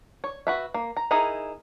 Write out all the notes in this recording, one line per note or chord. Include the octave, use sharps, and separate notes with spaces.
C#5
F#4 B4 E5
A#3
A#5
D#4 E4 G#4 A#4 A#5